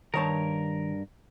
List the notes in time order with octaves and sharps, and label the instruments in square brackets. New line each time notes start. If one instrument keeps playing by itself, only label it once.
[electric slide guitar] G2 A#4 [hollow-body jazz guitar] D#3 C#5 A5